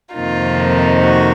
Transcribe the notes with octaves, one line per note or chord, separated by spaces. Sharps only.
F2 C3 D#3 A#3 D#4 F4
F#4